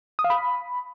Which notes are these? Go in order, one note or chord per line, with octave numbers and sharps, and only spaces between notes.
D#6
F5
B5